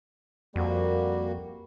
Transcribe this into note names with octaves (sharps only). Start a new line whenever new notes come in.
F2 G3 A#3 F#4